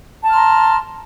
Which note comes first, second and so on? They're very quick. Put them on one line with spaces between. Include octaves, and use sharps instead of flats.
A5 F6 C6 A#5